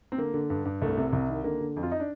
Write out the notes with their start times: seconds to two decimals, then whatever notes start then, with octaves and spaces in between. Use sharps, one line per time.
0.12 C4
0.18 D3 A#3
0.34 D3
0.50 G2
0.65 G2
0.82 C2 A3
0.97 C3
1.13 C2
1.28 D#3
1.44 D3 A#3
1.60 D3
1.77 F2
1.83 F4
1.92 D#4
2.00 D4